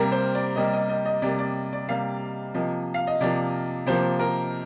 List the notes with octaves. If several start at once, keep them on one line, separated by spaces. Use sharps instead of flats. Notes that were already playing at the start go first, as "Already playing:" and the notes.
Already playing: C3 G3 A#3 A#4
C5
D5
C3 G3 A#3 D#5
D#5
D#5
D#5
C3 G3 A#3 D5
D5
D5
C3 G3 A#3 F5
C3 F3 A#3 D#5
F5
D#5
C3 F3 A#3 D5
C3 F3 A#3 C5
A#4